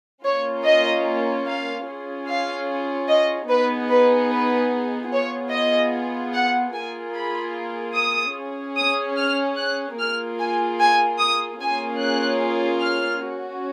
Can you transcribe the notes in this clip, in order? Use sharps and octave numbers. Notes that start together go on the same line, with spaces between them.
A#3 C#4 F4 C#5
D#5
F5
C#4 F4 G#4
F5
D#5
B3 D#4 G#4 B4
B4
B4
B3 F4 G#4 C#5
D#5
F#5
A#3 F4 G#4 G#5
B5
D#6
C#4 G#4
D#6
F6
F#6
A#3 F4 G#4 F6
G#5
G#5
D#6
A#3 C#4 F4 G#4 G#5
F#6
F6
C#4 F#4